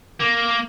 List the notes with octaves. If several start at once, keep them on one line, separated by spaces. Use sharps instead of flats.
A#3